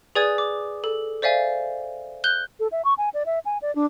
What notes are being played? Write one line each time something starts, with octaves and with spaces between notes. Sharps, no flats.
G#4 B4 D5 G#5 D#6 G#6
D6
A4
C5 D5 E5 F5 G#5
F#6 G6 G7
A4
E5
C#6
G#5
D5
E5
G#5
D5
D4